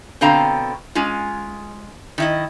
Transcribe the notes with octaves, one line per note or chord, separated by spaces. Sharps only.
B2 D3 C4 F5 A#5
G#3 C#4 F4
D#3 E4 D#5